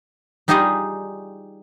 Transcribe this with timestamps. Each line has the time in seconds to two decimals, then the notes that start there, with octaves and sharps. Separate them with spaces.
0.48 G3 D#4 F4 G4 G#4 D#5